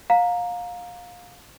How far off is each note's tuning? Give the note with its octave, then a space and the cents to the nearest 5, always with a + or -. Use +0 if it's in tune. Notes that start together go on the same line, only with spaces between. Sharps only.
F5 +25 A#5 +0